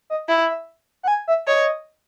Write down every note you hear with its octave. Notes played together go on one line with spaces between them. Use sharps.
D#5
E4 E5
F#5
G#5
E5
C#5 D#5